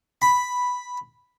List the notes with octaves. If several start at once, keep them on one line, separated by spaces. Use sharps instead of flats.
B5